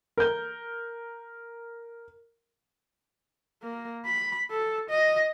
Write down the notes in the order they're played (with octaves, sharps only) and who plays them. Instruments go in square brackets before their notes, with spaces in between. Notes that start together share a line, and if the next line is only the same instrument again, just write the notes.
[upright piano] A#4 G6
[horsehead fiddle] A#3
B5
A4
D#5